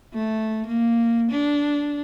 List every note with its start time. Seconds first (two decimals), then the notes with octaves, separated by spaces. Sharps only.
0.14 A3
0.67 A#3
1.32 D4